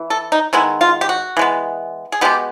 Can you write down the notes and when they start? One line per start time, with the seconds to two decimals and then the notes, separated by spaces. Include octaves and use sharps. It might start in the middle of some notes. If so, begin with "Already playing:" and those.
Already playing: E3
0.10 A4
0.32 D#4
0.53 D#3 G#3 B3 E4
0.81 F4
1.01 G4
1.09 F#4
1.37 E3 G#3 B3
2.12 G#4
2.21 B2 G#3 B3 G4